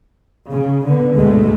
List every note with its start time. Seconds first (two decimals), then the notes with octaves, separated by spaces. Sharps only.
0.47 C#3
0.85 D3 B3
1.16 D2 G#2 B2 D3 G#3 A3